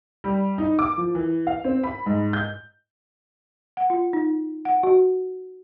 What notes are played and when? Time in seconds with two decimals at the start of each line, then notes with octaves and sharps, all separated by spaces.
0.24 G3
0.58 D#4
0.79 D6
0.97 F3
1.15 E3
1.47 F5
1.64 C4
1.83 B5
2.06 G#2
2.33 G6
3.77 F#5
3.90 F4
4.13 D#4
4.65 F#5
4.83 F#4